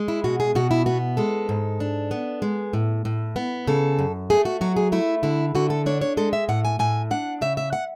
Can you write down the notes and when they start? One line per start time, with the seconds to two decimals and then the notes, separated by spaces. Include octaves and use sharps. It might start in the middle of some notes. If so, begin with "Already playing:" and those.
Already playing: G#3
0.08 E4
0.24 B2 F#4
0.40 G#4
0.55 B2 F#4
0.71 E4
0.86 B3 F#4
1.17 G#3 A4
1.49 G#2
1.80 D4
2.11 B3
2.42 G#3
2.73 A2
3.05 A2
3.36 B3
3.67 C#3 A4
3.99 F#2
4.30 A3 G#4
4.45 F#4
4.61 F#3 F#4
4.76 G#4
4.92 A3 E4
5.23 D3 E4
5.55 D3 F#4
5.70 A4
5.86 D4 C#5
6.01 C#5
6.17 G#3 A4
6.33 E5
6.49 A2 F#5
6.65 G#5
6.79 A2 G#5
7.11 D4 F#5
7.41 C#3 E5
7.57 E5
7.73 F#5